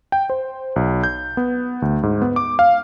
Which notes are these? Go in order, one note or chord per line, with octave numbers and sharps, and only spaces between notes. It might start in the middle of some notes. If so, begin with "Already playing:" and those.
G5
C5
B1
G6
B3
D2
G#2
B3
D6
F5